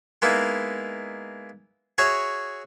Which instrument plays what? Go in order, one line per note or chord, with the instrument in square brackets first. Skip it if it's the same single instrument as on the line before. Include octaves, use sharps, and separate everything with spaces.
[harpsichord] G#3 A#3 B3 D#4 E4
F#4 G#4 C#5 E5 A#5